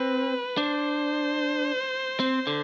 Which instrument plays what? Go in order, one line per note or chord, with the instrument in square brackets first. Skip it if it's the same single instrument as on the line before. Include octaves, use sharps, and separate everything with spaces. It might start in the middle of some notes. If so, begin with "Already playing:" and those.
Already playing: [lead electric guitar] C4 [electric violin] B4
[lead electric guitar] D4 [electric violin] C5
[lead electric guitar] C4
D3